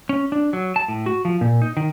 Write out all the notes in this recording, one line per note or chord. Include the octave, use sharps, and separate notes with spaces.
C#4
D4
F#3
A5
A2
F#4
F3
A#2
D#4
D#3